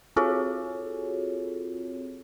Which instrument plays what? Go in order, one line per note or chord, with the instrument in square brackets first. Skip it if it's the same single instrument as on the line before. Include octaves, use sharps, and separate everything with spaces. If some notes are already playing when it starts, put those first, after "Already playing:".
[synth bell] C4 F4 F#4 G#4 A4 C#5